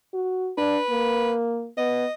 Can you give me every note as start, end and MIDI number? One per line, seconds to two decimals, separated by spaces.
0.14 0.52 66
0.58 0.78 62
0.58 1.33 71
0.90 1.69 58
1.77 2.05 59
1.77 2.14 75